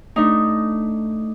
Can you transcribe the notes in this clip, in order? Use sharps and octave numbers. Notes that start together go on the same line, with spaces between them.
A3 D4 D#4